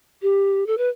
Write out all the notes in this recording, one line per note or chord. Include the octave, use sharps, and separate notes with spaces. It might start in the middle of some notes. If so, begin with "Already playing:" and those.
G4
A4
B4